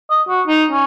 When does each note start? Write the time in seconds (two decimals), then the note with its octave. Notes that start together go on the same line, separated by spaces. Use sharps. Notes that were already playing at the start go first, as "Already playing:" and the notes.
0.10 D#5
0.29 F#4
0.47 D#4
0.71 C#4